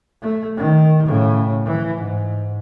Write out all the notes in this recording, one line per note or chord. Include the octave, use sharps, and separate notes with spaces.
A3
D#3
A2 C#3
E3
G#2